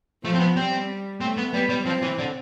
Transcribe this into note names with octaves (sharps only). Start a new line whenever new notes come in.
F3 A3
C4
B3
G3 C4
A3 C4
B3
G3 B3
G3
F3 C4
E3
D3